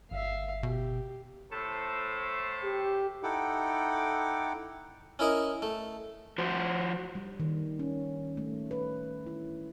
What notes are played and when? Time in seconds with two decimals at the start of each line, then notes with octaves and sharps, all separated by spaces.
0.11 G1 E5 F5
0.63 B2 G4
1.52 A2 A4 C5
2.63 G4
3.23 D#4 E4 A4 F#5 G5 D6
5.19 C#4 E4 A#4 D#5
5.62 A3
6.38 F3 F#4 C5
7.15 G3
7.40 D#3
7.79 C#4
8.37 A3
8.71 B4
9.26 E4